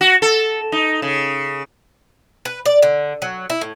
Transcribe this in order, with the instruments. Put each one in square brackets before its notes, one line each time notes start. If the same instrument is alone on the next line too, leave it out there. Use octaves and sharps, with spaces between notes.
[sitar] F#4
A4
D#4
C#3
[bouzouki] B4
D5
D3
F#3
E4
A2